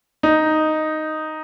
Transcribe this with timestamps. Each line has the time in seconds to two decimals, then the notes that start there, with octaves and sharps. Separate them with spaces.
0.23 D#4